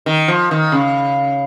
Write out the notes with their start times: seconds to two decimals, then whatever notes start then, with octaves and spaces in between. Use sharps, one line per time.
0.06 D#3
0.28 F3
0.51 D#3
0.72 C#3